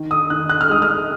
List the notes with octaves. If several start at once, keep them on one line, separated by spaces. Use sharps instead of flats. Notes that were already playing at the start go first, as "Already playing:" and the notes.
Already playing: D#3
D#6
D#3 F#6
F#6
F6
G#3 D#6
F6